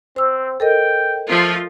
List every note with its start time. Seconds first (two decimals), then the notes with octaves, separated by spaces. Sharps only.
0.16 C4 C5 E6
0.60 A4 A#4 D#5 G5
1.28 F3 A3 F4